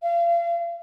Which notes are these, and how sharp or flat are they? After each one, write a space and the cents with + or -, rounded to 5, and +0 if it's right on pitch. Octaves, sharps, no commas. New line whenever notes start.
F5 -35